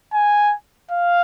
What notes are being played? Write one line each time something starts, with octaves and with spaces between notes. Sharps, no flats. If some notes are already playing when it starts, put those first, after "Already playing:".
G#5
F5